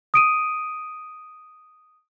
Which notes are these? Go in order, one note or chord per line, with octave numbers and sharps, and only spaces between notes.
D#6 D7 D#7